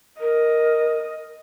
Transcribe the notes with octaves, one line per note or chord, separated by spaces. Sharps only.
A#4 D#5